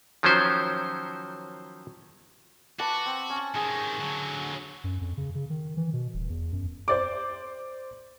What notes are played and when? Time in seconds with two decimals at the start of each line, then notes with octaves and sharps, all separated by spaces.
0.23 D#3 F3 F#3 C#4 C5
2.80 F#4 B4 A5 D6
3.06 C4
3.30 C#4
3.55 C3 D#3 G#4
4.01 D3 F#3
4.84 F#2
5.01 F2
5.17 C#3
5.35 C#3
5.50 D#3
5.77 E3
5.93 B2
6.14 D#1
6.30 E2
6.53 F#2
6.88 C5 D5 D6